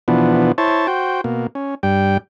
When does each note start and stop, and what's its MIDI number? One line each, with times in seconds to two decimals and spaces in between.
0.08 0.52 47
0.08 0.52 52
0.08 0.52 53
0.08 0.52 59
0.08 0.52 62
0.58 0.87 64
0.58 0.87 72
0.58 0.87 73
0.58 0.87 81
0.87 1.21 66
0.87 1.21 72
0.87 1.21 79
1.24 1.47 47
1.24 1.47 58
1.55 1.75 61
1.83 2.17 43
1.83 2.17 55
1.83 2.17 79